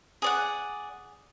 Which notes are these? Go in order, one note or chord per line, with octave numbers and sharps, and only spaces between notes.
G#4 D5 F#5